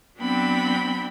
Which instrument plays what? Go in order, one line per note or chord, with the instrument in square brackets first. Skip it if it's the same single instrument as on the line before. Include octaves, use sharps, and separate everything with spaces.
[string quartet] F#3 B3 C4 D4 G5 B5